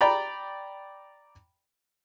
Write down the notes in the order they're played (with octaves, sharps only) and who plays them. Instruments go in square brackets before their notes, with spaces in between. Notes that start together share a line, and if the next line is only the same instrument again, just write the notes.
[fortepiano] D5 G5 A#5 B5